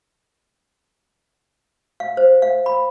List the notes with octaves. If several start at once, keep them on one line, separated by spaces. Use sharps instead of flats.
F5
C5
F5
B5